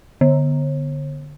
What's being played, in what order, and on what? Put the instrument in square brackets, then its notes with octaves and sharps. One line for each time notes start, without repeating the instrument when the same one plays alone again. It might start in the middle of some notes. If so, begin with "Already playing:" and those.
[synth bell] D3